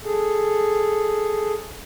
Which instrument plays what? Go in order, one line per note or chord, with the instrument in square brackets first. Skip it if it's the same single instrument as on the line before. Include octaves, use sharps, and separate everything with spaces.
[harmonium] G#4 A4